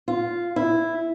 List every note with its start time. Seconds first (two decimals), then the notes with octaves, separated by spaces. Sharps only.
0.08 F4
0.56 E4